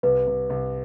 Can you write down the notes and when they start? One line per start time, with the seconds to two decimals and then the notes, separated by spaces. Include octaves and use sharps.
0.03 C2 B4
0.27 C2
0.50 C2